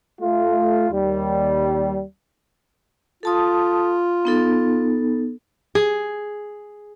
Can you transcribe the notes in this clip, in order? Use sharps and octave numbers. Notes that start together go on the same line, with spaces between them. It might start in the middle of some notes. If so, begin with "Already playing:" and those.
A3 F4
D#2 G3
F4 A4 A5 D#6
B3 D#4 A4
G#4